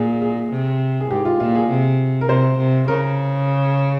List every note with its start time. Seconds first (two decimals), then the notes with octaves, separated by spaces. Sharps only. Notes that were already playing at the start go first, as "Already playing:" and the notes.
Already playing: A#2 G#4
0.22 G#4
0.52 C3
1.01 G#4
1.10 G#2 G4
1.25 F4
1.40 A#2 F4
1.55 G#4
1.70 C3
2.21 A#4
2.29 C3 C5
2.59 C3
2.88 C#3 A#4